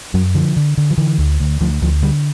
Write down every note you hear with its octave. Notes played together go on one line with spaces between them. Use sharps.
F#2 F#3
D3 F3
D3
D3
F3
D3 E3
D2
D2
D2 F3
D2 F3
D3 G3